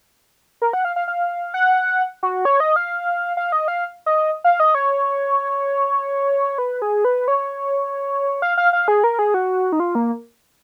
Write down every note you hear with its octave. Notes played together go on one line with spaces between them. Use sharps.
A#4
F#5
F5
F5
F5
F#5
F#4
C#5
D#5
F5
F5
D#5
F5
D#5
F5
D#5
C#5
B4
G#4
B4
C#5
F5
F5
F5
G#4
A#4
G#4
F#4
D#4
F4
A#3